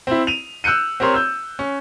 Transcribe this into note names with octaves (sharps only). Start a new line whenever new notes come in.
C4 E4
D#7 F7
E6 F#6 G6 C#7 D#7
C4 G4 A#4 C#5 C6
E6 G6
C#4